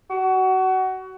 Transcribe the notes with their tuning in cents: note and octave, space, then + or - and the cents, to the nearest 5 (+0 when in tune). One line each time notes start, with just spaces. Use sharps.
F#4 +25